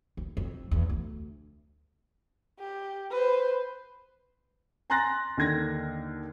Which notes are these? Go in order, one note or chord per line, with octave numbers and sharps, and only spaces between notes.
D#2
F2
E2
D2
G4
B4 C5
G#5 A#5 C6 F#6 A6 A#6
D#2 D3 G#6 A#6